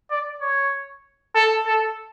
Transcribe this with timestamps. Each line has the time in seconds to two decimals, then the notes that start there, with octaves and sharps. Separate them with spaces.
0.11 D5
0.41 C#5
1.35 A4
1.66 A4